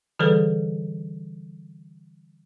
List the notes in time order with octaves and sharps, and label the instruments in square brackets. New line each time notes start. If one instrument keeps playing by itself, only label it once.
[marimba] D3 E3 G3 G#4 A4 B4